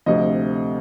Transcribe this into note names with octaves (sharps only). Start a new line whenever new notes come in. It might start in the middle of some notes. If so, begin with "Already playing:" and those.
D2 C3 F3 D#5